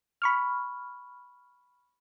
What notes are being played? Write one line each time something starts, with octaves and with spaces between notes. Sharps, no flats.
B5 C#6 F6